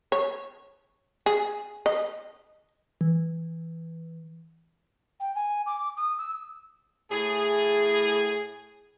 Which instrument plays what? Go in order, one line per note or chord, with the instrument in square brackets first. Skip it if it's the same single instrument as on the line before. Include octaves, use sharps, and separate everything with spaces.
[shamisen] C#5
G#4
D#5
[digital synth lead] E3
[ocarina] G5
G#5
D6
D#6
E6
[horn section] A2 G#4